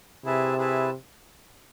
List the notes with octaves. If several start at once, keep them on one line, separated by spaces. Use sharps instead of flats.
C3 E4 G#4 B4 E5 A5
E4 G#4 B4 E5 A5